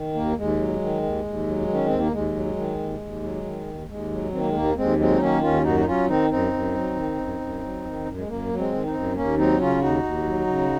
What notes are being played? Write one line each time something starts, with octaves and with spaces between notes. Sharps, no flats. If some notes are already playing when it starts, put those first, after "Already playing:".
Already playing: D#3
D#2 A#3
D#2 G#3
F#3
D#3
D#2
D#2
F#3
D#3
C#4
D#2 C4
A#3
D#2 G#3
F#3
D#3
D#2
D#2
F#3
D#3
D#2
D#2 G#3
F#3
D#3 C4
A#3
G#3
D#2 A#3
D#2 G#3 C4
F#3 G#3 C4
D#4
D#3 A#3 C#4
D#2 C#4 F4
F#2 D#4 F#4
D#4
F#3 C#4 F4
D#3 C4 D#4
F#2 C4 D#4
F#2
F#3
D#3
F#2
F#2
F#3
D#3
F#2
G#3
F#2 A#3
F#3
G#3 C4
D#3
C4 D#4
F#2
D#2 A#3 C#4
F#3 C4 D#4
C#3 C#4 F4
D#2 D#4 F#4
D#2
F#3
C#3